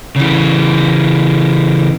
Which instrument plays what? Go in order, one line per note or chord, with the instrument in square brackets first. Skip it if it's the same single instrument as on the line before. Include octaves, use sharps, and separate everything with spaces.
[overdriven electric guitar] C#3 E3